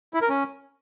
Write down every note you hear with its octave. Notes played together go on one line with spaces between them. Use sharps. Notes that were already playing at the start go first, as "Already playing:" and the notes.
E4
A#4
C#4